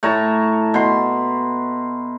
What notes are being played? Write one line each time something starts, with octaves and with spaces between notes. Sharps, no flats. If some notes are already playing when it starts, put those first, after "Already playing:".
A2 C#5 A5 A#5
B2 C6